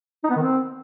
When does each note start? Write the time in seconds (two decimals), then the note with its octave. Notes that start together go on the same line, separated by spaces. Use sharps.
0.24 D#4
0.30 B3
0.36 D#3
0.42 C4